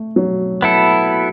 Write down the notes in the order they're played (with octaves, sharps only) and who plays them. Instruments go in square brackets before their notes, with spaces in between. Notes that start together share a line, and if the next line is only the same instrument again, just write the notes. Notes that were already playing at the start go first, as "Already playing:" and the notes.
Already playing: [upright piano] A3
F#3
[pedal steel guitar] B3 E4 A4